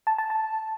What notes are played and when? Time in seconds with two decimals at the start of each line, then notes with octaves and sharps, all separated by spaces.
0.07 A5
0.18 A5
0.30 A5